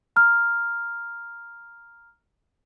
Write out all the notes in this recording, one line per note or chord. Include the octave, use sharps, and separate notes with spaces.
A#5 F6